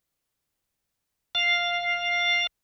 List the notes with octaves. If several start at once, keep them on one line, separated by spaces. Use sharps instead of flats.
F5